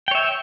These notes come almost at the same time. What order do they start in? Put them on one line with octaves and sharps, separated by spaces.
G5 C#5 E5